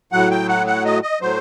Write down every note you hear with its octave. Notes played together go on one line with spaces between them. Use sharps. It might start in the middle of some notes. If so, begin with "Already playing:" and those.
A2 F#3 F#5
G5
F#5
F#5
D#5
D#5
A2 F#3 C5